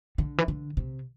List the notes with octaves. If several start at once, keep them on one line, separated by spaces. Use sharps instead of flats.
D3
E3
D3
C3